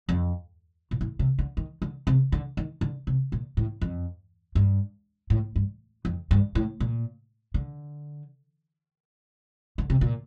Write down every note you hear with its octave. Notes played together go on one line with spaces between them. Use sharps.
F2
A#2
A2
C3
D3
D#3
D3
C3
D3
D#3
D3
C3
A#2
A2
F2
G2
A2
G2
F2
G2
A2
A#2
D3
D3
C3
A#2